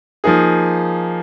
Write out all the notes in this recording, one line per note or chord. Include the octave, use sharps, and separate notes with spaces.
F3 A#3 D#4 G#4